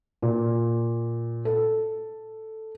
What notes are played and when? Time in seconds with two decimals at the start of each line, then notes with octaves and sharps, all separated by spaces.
0.22 A#2
1.45 A4